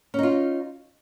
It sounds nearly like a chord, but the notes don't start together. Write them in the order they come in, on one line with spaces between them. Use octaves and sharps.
C#4 D#4 F4